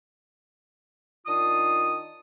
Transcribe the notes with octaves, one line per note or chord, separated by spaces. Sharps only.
D#3 D4 F4 D#6